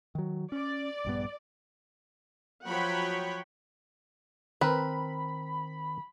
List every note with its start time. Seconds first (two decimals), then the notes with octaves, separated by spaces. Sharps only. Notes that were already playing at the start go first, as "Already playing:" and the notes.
0.15 D#3 F#3
0.52 C#4 D5
1.05 A#1 G2 B3
2.67 F3 F#3 C#5 F#5 G5 B5
4.61 D#3 C4 A#4 B4 B5